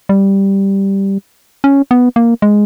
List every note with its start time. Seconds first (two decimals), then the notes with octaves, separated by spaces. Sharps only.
0.09 G3
1.64 C#4
1.91 B3
2.16 A#3
2.42 G#3